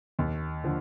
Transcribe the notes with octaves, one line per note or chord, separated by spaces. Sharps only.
D#2
D3 F3